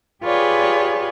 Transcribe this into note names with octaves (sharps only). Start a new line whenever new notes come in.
F4 G4 G#4 B4 C#5 D5